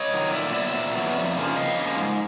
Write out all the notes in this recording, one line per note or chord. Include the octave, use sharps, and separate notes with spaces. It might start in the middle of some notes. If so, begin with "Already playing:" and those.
Already playing: C#5 D#5
D#3 F#3
A#2 D5 E5
F#3 B3 D5 E5
A#2
F#3 B3
F2
C#3 F3 A#3
F2 D#5 F5
C#3 F3 A#3
G#2